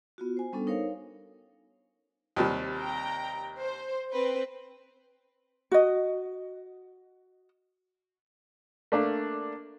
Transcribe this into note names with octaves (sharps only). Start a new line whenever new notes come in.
B3 F4 F#4
C5 G#5
G3 B3 C#4 D4 A4
D#4 A#4 C5 C#5 F5
F5
D#2 C3 G3
G5 A#5
C5
C4 B4 C5
F#4 D#5
A3 A#3 D4 F5